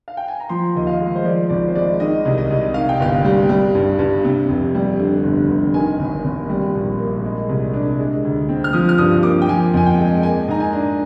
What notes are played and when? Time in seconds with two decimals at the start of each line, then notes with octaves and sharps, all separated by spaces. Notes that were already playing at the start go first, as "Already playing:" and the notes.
0.08 F5
0.17 G5
0.28 G#5
0.40 A#5
0.49 F3 C6
0.75 D#2 D#5
0.87 F5
1.00 G#3
1.15 C5
1.24 F3 D5
1.50 G#1 D5
1.68 C5
1.75 G#3 D5
2.00 D#3 D#5
2.25 C2
2.38 D#5
2.50 C2
2.74 D#3 F5
2.89 G5
3.00 G1 F5
3.25 G3
3.49 G3
3.75 G2
3.99 G2
4.25 C3
4.49 F1
4.75 G3
4.99 D3
5.24 G1
5.49 G1
5.74 D#3 G#5
5.99 G#1
6.24 G#1
6.49 G3
6.75 A#1
6.99 A#3
7.24 G#3
7.49 C2
7.74 D4
7.99 G#3
8.24 D2
8.49 C4
8.64 F6
8.73 F3 D#6
8.89 F6
8.98 G2 D#6
9.23 A#3 D6
9.42 G5
9.48 F3 G#5
9.74 F2 G#5
9.86 G5
9.98 G#3
10.23 A#3 G#5
10.48 G#2 A#5
10.60 G#5
10.73 D4